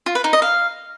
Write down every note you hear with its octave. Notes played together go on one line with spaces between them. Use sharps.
F4
B4
D#4
D#5
F5